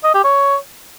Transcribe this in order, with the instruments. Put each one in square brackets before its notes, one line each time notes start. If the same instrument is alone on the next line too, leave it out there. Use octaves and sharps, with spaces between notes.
[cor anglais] D#5
G4
C#5